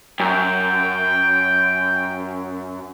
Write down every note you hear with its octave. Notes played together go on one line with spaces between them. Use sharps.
F#2 G5